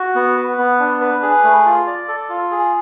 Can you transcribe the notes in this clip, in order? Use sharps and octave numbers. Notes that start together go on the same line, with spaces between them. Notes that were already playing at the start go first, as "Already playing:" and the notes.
Already playing: F#4
B3
B4
B3
D4
B4
G#4
A3
F4
D5
A4
F4
G#4